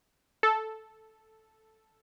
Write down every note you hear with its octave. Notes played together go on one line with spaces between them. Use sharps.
A4